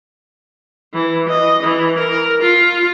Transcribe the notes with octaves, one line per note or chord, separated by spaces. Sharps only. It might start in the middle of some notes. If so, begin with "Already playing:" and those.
E3
D#5
E3
A#4
F4